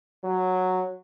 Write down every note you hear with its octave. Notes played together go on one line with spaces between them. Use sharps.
F#3